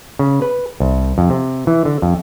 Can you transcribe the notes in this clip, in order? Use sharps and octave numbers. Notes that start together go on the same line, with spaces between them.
C#3
B4
C2
F2
C3
E3
D3
F2